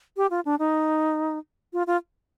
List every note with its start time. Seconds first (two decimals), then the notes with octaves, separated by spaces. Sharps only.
0.17 G4
0.30 F4
0.45 D4
0.59 D#4
1.73 F4
1.87 F4